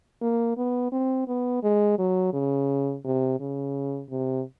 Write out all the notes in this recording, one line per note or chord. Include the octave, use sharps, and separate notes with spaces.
A#3
B3
C4
B3
G#3
F#3
C#3
C3
C#3
C3